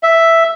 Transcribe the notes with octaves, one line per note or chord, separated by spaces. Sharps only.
E5